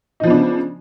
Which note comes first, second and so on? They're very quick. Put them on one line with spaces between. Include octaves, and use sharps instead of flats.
D#4 F3 B3 D4 C#3